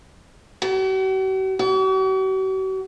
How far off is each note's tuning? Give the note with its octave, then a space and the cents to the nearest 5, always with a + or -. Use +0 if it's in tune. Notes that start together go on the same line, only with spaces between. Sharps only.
F#4 +45
F#4 +45